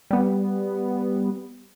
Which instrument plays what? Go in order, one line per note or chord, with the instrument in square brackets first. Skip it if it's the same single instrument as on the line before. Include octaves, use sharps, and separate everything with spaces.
[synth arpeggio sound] G3 B3